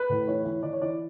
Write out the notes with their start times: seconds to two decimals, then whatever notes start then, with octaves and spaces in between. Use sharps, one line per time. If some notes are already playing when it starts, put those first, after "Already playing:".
Already playing: B4
0.10 A2
0.27 E3 C#5
0.45 E3
0.63 E3 D5
0.73 C#5
0.81 E3 D5